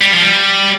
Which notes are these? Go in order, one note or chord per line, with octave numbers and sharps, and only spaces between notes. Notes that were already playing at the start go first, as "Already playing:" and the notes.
G3
F3
G3